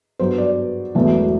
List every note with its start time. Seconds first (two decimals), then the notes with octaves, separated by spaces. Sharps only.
0.19 G2 F#3 B3 C5
0.38 D5
0.95 E1 E2 B2 F#3 A3